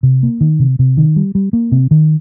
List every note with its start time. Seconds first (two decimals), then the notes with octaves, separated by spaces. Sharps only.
0.03 C3
0.23 A#3
0.41 D#3
0.59 C3
0.79 C3
0.97 D#3
1.16 G3
1.35 G3
1.53 A#3
1.72 C3
1.91 D#3